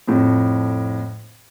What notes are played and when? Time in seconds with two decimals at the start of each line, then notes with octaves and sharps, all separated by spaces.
0.08 F2 A2